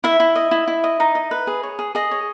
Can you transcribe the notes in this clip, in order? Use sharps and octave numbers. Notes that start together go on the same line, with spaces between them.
E4 E5
E4
D#5
E4
E4
D#5
D#4
D#5
B4
G#4
C#5
G#4
G#4 D#5
C#5